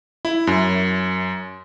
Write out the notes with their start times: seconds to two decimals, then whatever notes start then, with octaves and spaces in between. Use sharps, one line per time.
0.25 E4
0.47 F#2